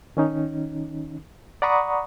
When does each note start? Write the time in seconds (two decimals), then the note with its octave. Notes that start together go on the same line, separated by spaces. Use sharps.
0.17 D#3 C#4 D#4
1.62 D5 F#5 A#5 B5 C#6 D#6